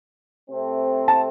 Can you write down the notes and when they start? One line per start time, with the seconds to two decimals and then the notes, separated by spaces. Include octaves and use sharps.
0.49 C3 A3 C4 A4
1.08 A5